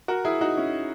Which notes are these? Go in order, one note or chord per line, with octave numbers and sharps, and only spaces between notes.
F#4 A#4
E4 G#4
D#4 F#4
C#4 E4